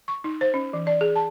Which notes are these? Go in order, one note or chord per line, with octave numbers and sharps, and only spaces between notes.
C#6
D#4
C5
C#4
E3
D5
G#4
A5